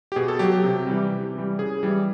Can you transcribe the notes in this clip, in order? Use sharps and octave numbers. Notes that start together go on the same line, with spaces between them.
G4
B2 G#4
A4
F#3 G4
G4
C3
E3 G3
C3
E3 G3
C#3 G#4
E3 G3